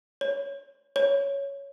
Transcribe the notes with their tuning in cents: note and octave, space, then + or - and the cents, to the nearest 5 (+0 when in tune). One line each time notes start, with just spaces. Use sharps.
C#5 +10
C#5 +5